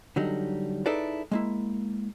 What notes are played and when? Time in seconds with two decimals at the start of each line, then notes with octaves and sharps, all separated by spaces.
0.16 D3 F#3 G3 D#4
0.86 D#4 E4 G#4 A4 B4 D5
1.31 G#3 A#3 E4